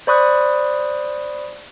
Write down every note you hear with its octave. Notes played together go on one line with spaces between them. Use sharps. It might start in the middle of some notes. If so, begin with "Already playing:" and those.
C5 D5 B5 C#6 D#6 F#6